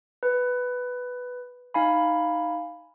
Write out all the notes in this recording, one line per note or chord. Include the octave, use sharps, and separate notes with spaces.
B4
D#4 F5 G#5 B5